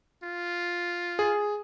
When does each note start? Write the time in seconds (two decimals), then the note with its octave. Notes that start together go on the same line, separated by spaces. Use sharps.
0.23 F4
1.19 G#4